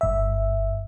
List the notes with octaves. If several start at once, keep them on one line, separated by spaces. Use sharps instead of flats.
G1 G2 E5